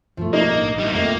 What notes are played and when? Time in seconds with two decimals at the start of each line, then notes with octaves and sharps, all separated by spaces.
0.17 B1 F#2 F3 A3
0.33 A#3 D#4
0.55 A1 D4
0.79 G3 E4
0.92 F2 C3 A3 A#3 C4
1.04 F4